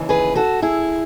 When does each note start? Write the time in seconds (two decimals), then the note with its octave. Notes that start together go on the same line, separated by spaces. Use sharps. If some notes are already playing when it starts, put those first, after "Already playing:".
Already playing: D#2 C#3 E3
0.09 G#4 B4
0.35 F#4 A4
0.62 E4 G#4